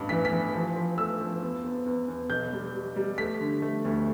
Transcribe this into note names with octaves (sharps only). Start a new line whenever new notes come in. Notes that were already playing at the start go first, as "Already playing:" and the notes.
Already playing: A1 G2
E3 B6
B6
E3
F3
F3
A3 E6
F3
E2
E2
E2
E2
B1 G6
G3
G3
G3
A3 B6
D3
A3
D2